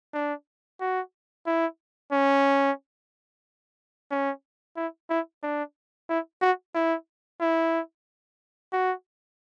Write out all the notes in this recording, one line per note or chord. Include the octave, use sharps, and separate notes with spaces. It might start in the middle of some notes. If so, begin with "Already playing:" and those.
D4
F#4
E4
C#4
C#4
E4
E4
D4
E4
F#4
E4
E4
F#4